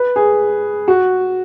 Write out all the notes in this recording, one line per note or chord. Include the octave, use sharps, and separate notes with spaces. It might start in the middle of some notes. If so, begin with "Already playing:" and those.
Already playing: B4
G#4
F#4